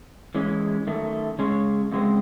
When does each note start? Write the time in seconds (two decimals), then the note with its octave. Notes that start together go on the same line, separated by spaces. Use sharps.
0.35 E3 G#3 C#4
0.87 F#2 D#3 A3
1.39 C#3 G#3 C#4 G#4 C#5
1.92 F#2 C#3 G#3 C4